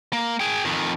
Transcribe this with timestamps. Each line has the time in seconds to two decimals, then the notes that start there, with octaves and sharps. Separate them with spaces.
0.13 A#3
0.40 G#4 G5
0.65 F2 D#3